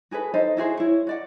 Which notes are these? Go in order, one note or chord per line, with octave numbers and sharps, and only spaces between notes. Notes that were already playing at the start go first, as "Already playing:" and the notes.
F#4 G#4 A4 B4
D#4 A4 C5 D#5
E4 F#4 G#4 C5
E4 C#5
F#4 D5 F#5